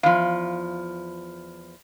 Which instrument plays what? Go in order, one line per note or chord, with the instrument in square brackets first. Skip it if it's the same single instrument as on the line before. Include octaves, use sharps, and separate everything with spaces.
[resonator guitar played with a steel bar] E2 F3 [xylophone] F5